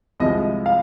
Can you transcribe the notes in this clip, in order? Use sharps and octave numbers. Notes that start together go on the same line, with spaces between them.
C2 C3 F3 G#3 D#5
F5